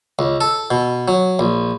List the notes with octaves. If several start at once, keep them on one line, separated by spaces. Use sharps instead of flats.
C#2
A4
B2
F#3
A#1